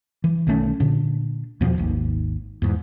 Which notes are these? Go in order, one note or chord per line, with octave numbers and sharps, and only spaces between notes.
E3
B1 D#3 A3 C#4
A#2 D3 D4
E2 B2 F3 C4
G#1 D#2
E2 G#2